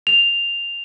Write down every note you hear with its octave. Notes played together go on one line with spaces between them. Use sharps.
F7